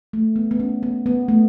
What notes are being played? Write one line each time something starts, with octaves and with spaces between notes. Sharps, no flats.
A3
B3
B3
C#4
B3
B3
A3